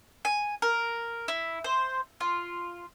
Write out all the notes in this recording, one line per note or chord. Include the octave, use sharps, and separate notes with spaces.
G#5
A#4
E4
C5
F4